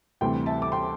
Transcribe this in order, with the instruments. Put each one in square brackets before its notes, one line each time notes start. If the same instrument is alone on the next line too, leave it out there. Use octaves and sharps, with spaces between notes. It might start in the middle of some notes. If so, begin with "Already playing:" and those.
[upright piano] D2 C3 E3 G3 G5 C6
E5 A5
D6
G5 C6